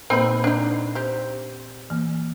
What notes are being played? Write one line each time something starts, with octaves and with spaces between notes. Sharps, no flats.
A#2 A#3 C4 D#4 B4
D4 D#4
C4 G4
E3 A#3